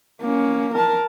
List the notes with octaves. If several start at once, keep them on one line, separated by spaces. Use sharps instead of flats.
A#3 C#4
A#4 A5